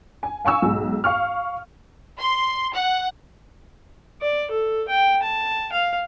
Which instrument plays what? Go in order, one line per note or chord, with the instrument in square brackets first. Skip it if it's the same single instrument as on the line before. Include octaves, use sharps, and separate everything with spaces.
[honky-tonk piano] G#5
F5 G#5 C#6 E6
B1 G#2
F5 C#6 F6
[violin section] C6
F#5
[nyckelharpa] D5
A4
G5
A5
F5